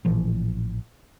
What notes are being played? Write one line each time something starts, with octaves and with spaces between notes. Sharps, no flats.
A1 A#2 E3 F3